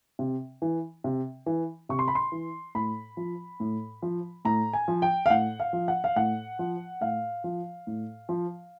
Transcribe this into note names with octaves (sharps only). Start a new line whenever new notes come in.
C3
E3
C3
E3
C3 C#6
C6
B5
C6
E3
A2 B5
F3
A2
F3
A2 A#5
G#5
F3
G5
F5
A2 F#5
F5
F3
F#5
F5
A2 F#5
F3
A2 F5
F3
A2
F3